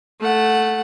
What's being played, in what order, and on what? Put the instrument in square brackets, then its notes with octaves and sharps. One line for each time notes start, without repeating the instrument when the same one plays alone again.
[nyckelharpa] A3 F#5